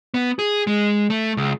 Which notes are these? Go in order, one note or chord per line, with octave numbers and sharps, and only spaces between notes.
B3
G#4
G#3
A3
C#2